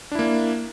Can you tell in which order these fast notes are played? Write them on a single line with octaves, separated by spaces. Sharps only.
D4 E4 A#3